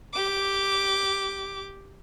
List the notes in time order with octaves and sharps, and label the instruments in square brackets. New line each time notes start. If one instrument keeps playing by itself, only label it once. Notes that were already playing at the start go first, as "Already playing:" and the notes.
[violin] G4 D6